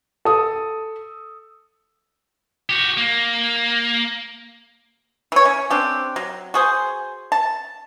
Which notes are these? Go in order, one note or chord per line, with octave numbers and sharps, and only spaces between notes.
A4 D#6
F#4 G4
A#3
E3 C#5
C#4
C4 D4 G4
F#3
F#4 G#4 C5
A5